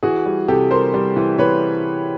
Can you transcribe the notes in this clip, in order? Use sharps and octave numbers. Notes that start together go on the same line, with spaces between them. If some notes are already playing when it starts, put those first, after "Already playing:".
E3 F#4 G#4
G3
C3 G4 A4
G3 A#4 C5
G3
E3
E3 B4 C#5